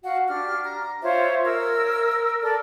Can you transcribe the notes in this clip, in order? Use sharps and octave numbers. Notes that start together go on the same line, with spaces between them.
F#4 F5 F#5
D4 G4 F6
A#5
F4 C5 C#5 E5
A#4 E6
A4 A#4 D5